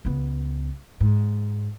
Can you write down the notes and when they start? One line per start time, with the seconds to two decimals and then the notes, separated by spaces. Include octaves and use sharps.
0.05 C#2 B3
1.00 G#2